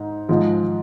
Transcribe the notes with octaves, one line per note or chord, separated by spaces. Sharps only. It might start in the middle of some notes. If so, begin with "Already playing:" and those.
Already playing: G#2 D#4
G#2 F3 G#3